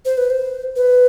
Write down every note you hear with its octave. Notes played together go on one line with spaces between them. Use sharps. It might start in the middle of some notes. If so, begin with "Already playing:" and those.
C5
B4
C5
B4